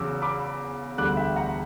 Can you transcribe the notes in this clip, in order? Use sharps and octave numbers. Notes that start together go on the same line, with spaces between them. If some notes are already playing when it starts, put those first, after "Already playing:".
Already playing: E2 C#3 F#3 D6 E6
B5 D6
E1 D2 D3 G3 D6 F#6
E5 G5
F#5 A#5